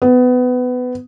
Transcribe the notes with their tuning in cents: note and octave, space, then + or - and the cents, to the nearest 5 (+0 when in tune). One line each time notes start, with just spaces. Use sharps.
B3 +20